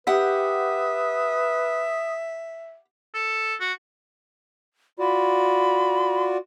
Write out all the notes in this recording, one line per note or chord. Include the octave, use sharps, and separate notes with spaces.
G4 B4 E5 F#5 D#6
A4
F#4
F4 F#4 D5 B5